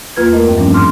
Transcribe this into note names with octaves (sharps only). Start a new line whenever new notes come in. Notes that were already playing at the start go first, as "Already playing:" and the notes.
E2 A#3 F4 B4 G#6
A3 A#3 A#4 D#5
G2 E3 C4 G5
F3 G3 A3 C#4 D4
G#2 C6 D6 F6